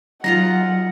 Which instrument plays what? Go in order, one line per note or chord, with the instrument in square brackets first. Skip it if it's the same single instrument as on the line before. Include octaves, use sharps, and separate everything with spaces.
[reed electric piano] F#3 [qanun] D#4 F4 A#5 [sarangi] F#5 [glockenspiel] A#6